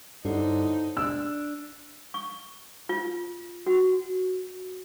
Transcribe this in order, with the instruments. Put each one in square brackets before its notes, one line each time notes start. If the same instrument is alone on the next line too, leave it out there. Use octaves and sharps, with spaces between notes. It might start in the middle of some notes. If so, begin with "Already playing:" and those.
[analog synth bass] G2 [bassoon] D3 [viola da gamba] D#4 [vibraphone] E4 C5 C#5
[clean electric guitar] D4 [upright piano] E6
[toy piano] C#6
F4
F#4